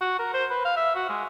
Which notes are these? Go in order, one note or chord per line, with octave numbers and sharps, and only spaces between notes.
F#4
A#4
C5
B4
F5
E5
F#4
G#3